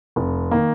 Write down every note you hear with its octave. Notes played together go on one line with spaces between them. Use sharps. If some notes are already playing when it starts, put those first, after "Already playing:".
F1
D#3 A#3